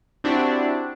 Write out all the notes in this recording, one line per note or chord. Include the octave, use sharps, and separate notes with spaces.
C4 D4 E4 F#4 G4